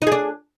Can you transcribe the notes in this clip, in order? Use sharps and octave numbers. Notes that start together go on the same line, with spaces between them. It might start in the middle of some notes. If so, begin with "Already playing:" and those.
D4 D#4 G#4